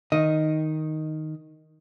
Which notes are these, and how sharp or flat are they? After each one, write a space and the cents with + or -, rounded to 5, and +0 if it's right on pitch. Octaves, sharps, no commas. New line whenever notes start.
D#3 +0 D#5 +0